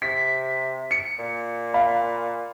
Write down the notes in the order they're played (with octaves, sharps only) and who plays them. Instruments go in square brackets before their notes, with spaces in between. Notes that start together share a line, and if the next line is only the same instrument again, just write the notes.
[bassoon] C3 [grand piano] B6
[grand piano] C#7
[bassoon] A#2
[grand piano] F5 B5